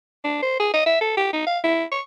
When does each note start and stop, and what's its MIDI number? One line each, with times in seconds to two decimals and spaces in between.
0.24 0.41 62
0.42 0.56 72
0.60 0.71 68
0.74 0.82 75
0.86 0.97 76
1.01 1.13 69
1.17 1.28 67
1.33 1.46 63
1.47 1.59 77
1.64 1.84 64
1.92 2.02 85